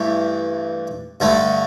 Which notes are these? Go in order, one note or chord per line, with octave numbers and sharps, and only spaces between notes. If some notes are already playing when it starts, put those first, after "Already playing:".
Already playing: G2 E3 A3 G4
G2 D3 A3